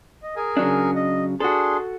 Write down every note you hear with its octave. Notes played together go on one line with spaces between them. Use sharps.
D#5
G#4 A#4 G#5
C#3 F#3 D4
D#5
D4 F#4 G#4 A4 C6